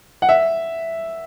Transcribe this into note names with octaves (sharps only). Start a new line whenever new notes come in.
F#5
E5